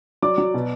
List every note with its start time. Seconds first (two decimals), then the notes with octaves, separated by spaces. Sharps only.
0.22 F#3 D5 D6
0.38 F#3
0.54 B2